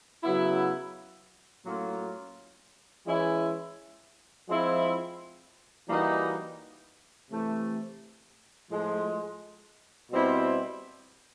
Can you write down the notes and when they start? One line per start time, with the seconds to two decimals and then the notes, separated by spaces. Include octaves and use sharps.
0.23 C#3 F#3 B3 E4
1.64 A2 F#3 A#3 C#4 F4
3.06 E3 G#3 C#4 E4
4.47 F3 G#3 C4 E4
5.88 E3 G3 A#3 D#4 F#4
7.29 C3 E3 A3
8.70 A2 F3 G#3
10.11 B2 G3 C4 E4